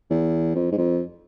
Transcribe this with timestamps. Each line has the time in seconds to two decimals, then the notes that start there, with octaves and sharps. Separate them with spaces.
0.10 E2
0.55 F2
0.72 G#2
0.78 F2